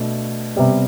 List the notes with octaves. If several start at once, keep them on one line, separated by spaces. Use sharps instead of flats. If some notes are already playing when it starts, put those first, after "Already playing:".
Already playing: B2 A3 D4
C3 G3 B3